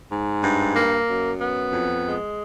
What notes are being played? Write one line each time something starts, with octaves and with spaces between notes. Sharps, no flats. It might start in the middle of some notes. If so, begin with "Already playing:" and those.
G#2
G2
A#3
F#2
B3
F2
G#3